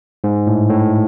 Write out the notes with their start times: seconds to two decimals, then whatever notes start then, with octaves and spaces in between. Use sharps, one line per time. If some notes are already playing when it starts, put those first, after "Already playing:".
0.24 G#2
0.47 A2
0.69 A2